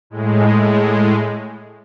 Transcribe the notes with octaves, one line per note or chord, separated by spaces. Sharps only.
A2 G#3